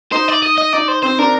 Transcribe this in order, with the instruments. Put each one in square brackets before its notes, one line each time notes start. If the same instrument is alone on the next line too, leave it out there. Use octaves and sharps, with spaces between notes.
[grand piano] D#4 [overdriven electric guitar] C5
[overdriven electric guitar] D5
D#5
D#5
[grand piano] D#4 [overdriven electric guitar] D5
[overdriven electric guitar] C5
[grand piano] C4 [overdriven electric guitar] C5
[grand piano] D4 [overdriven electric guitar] A#4